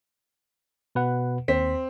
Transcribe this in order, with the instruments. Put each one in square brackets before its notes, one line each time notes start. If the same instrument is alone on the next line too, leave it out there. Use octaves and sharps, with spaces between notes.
[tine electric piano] B2 B4 F#5
[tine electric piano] D#2 B6 [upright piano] C4